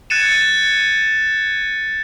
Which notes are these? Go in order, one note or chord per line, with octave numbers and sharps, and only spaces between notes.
F#6 G#6 A6 C#7 D#7 E7